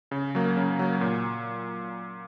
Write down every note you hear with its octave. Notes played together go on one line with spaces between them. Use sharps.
C#3
F#3 A#3
C#3
F#3 A#3
A#2